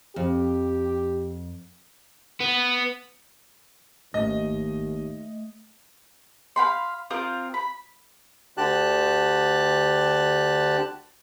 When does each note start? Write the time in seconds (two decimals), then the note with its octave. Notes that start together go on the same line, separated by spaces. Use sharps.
0.16 F2 G4
2.40 B3
4.14 G#1 D#2 A3 D#5
6.56 F5 G5 B5 C6
7.10 C4 F4 A#4 D#6
7.54 B5
8.57 D2 D3 G4 A5 F#6